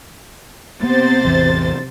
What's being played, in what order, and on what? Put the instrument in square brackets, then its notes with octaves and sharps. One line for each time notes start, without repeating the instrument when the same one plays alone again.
[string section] C3 C5 A6 [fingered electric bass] A#3 B3
[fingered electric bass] A1 E2 E3